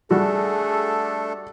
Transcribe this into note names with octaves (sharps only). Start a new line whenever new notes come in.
G3 A3 D4 F#4 G#4 A4